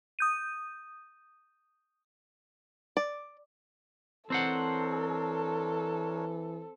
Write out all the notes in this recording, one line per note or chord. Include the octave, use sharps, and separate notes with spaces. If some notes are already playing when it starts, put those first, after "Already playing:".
D#6 G6 D#7
D5
E3 C4 D4 A4 A#4 C5 C#5 F#5